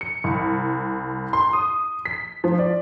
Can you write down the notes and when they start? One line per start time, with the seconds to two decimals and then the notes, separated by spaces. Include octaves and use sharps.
0.01 C#7
0.24 C2
1.33 C6
1.53 D#6
2.05 B6
2.44 F3
2.59 D5